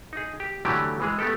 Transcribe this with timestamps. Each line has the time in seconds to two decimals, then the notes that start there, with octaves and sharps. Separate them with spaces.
0.13 D#4 G#4
0.40 G4
0.65 D3 E3 F#3 G3 A3 G4
1.00 E3 G#3 G#4
1.19 A3 B3 G4 A4